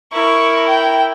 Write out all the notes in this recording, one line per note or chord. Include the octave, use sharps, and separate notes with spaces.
E4 A#4 C#6
G5